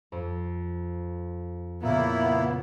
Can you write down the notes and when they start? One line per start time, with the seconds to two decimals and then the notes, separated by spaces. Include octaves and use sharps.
0.12 F2
1.83 A#2 C#3 A#3 B3 E4